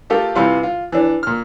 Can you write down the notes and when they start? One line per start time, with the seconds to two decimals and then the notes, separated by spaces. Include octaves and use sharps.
0.10 A3 F4 G4 A4 A#4
0.35 C3 E3 G3 F4 B4
0.63 F4
0.92 E3 D4
1.23 A#2 F6